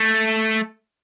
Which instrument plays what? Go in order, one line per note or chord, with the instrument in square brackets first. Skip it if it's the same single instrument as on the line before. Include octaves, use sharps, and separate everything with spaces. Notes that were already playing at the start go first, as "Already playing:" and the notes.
Already playing: [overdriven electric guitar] A3